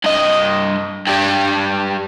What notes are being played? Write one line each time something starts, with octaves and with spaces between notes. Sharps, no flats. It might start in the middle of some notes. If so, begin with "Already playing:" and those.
G2 D#5
G2 G3